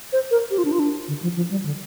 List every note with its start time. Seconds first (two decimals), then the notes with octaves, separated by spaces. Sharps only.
0.13 C5
0.31 A#4
0.51 G4
0.58 F4
0.65 D4
0.72 F4
0.79 D4
1.08 D3
1.22 F3
1.36 F3
1.51 G3
1.65 D3